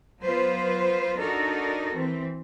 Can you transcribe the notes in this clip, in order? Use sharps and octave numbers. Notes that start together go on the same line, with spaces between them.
F#3 B3 F4 B4 C5
D4 D#4 F#4 A4 A#4
E3 C4